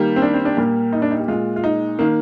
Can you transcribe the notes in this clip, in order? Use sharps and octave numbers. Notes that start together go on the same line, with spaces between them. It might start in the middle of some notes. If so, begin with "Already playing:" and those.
Already playing: D#3 G3 A#3
C4
D4
C4
D4
A#2 G3 A#3 G4
D#4
D4
D#4
G4
A#2 G#3 F4
F4
D#4
D#3 A#3